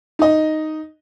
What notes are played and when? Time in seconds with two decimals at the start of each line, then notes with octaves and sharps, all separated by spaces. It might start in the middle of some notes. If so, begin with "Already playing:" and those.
0.19 D#4 D#5